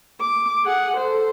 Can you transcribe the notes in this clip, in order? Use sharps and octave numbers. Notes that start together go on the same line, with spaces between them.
D6
G#4 F#5
A4 C5